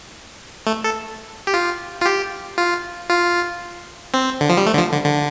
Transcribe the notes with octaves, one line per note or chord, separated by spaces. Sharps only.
A3
A4
G4
F4
F4
G4
F4
F4
C4
D3
F3
G3
A3
D3
F3
D3
D3